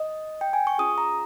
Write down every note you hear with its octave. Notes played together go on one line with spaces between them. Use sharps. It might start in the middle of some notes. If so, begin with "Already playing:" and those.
Already playing: D#5
G5
G#5
C#6
C#4 F4 G#4 D#6
A#5